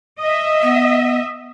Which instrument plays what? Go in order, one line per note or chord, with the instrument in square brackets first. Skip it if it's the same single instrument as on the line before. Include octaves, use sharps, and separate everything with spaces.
[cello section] D#5 E5
[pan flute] B3